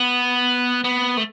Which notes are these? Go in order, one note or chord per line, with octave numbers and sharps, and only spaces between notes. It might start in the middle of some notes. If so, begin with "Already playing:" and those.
Already playing: B3
B3
A3